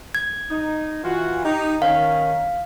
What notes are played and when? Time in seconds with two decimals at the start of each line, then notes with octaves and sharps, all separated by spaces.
0.15 G#6
0.50 D#4
1.04 E3 F4 F#4
1.44 D#4 G4
1.82 D#3 C#4 F5